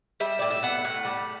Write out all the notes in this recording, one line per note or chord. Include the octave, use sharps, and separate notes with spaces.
G3 E5
A2 D5
E5
B3 F#5
A2
G3